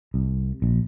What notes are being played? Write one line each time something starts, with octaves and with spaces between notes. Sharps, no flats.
C2
A#1